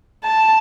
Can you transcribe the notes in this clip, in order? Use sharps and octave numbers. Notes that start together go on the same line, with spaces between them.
A5